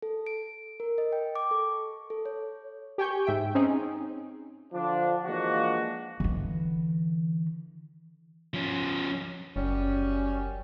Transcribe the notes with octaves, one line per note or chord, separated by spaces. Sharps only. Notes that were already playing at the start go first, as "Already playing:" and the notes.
A4
D7
A#4
D#5
G5
D6
A4
C#6
A4
C#5
G4 G5 G#5 C#6 G6
G#2 E5 G5 D7
C4 C#4 D#4 G#4
D3 F3 D4
E3 F3 G#3 A#3 D4 F#4
D3 E3
F3 C#4
F#1 F#2 G3 C#4